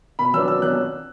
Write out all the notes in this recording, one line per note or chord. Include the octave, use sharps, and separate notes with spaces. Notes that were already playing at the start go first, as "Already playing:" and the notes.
B2 B5
F#3 B3 D4 E6
B2 E6
F#3 B3 F#6